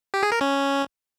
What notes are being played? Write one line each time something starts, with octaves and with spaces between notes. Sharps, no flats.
G4
G#4
A#4
C#4